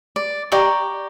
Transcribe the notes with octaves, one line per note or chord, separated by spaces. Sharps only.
D5
G4 D5 A#5 C#6